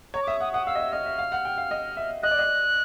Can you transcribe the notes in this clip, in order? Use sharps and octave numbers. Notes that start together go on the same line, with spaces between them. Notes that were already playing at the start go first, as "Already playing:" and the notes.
C#5 A#5
D6
E5 D#6
F#5 D#6
F#5 D#6
F5 E6
D#5
E5
D#5 F6
E5
F5
F#5
G5
F5
D#5
E5
D#5 F#6
D5
D#5